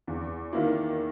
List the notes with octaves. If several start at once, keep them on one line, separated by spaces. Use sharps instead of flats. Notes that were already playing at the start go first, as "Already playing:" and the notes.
E2
D#3 A#3 E4